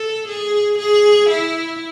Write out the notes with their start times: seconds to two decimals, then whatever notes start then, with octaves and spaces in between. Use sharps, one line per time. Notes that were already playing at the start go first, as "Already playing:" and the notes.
Already playing: A4
0.28 G#4
0.79 G#4
1.30 E4